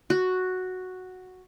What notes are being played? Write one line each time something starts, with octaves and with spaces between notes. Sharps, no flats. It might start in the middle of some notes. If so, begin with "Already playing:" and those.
F#4